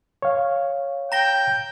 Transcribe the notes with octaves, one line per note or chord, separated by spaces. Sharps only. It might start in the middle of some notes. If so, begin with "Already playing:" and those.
C#5 F5
G5 A#5 A#6 G7